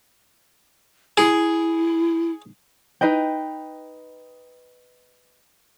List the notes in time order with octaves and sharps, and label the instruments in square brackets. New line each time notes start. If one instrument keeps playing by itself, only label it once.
[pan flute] E4 [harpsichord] G#4
[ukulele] D#4 B4 D#5 G5